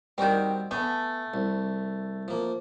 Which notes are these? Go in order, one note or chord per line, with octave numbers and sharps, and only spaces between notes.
D#3 G3 C4 F#4 D5
A3 B3 G#5
C2
F3 A#3